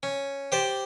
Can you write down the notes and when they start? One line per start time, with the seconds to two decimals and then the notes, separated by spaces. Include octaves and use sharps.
0.03 C#4
0.52 G4 C5 D5